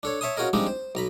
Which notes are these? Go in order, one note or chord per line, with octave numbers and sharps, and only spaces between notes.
D4 A4 C#5
C#5 E5 A5 C6 D#6
C#4 F4 F#4 G#4 A#4 D#5
F3 G3 G#3 C4 D4 D#4
C5
B1 A#5 B5